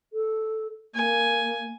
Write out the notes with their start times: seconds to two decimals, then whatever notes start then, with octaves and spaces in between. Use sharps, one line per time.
0.13 A4
0.94 A#3 G#5